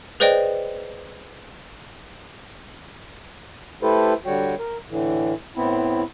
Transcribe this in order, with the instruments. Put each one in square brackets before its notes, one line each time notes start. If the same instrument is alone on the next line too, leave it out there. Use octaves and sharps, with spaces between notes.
[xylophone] G#4 B4 C5 D5 D#5 G5
[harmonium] A3 E4 G4 A4 B4 C5
D3 G3 F#4 C#5 G5
A#4
A2 D3 E3
A2 B3 C4 E4